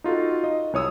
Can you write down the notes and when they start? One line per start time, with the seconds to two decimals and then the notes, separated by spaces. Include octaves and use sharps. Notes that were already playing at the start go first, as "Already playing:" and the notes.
0.04 D#4 F4 F#4 A4
0.44 D#5
0.73 C2 C#5 D#6 E6